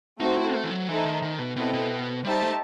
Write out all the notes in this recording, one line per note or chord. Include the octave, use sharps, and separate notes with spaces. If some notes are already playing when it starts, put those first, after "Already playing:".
A3 C4 D#4 F#4 C5
E4
A3
E3
F#3
E3 A3 D#4 A4 C5 E5
D#3
D#3
B2
B2 C4 E4 A4 D#5 G5
B2
G3 D#4 G4 C5 E5 A5
A3